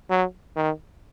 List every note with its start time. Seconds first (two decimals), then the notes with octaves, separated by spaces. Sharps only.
0.10 F#3
0.56 D#3